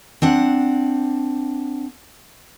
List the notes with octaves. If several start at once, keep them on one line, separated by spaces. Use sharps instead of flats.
C4 D4 F#5